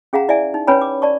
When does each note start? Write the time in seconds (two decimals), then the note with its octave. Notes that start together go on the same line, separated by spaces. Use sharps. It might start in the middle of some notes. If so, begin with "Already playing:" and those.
0.13 C#4 G#4 F5 F#5 A#5
0.28 E4 D5 E5 G#5
0.54 D#4
0.67 C#4 B4 C#5 G#5 A#5 B5
0.81 D6
1.02 D5 A5 C#6